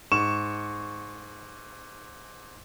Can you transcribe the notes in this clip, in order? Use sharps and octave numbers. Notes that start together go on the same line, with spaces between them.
G#2 C#6 E7